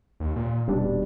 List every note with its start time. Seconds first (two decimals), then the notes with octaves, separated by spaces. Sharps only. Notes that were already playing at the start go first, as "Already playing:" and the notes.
0.20 D#2
0.36 A#2
0.68 D#1 B2 G3 D4